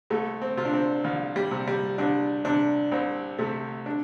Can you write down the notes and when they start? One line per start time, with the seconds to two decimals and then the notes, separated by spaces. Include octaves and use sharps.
0.10 C2 A3
0.42 C4
0.57 C3 F4
0.65 D4
0.73 C4
1.04 C2 F3
1.36 G3
1.51 C3
1.68 G3
1.98 C2 D4
2.45 C3 D4
2.92 C2 C4
3.39 C3 A3
3.86 D4